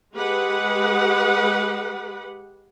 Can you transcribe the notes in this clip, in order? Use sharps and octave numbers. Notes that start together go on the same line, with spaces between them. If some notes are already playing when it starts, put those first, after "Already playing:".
G#3 G4 B4 F#5